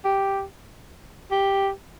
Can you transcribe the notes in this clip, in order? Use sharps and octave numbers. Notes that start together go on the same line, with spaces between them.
G4
G4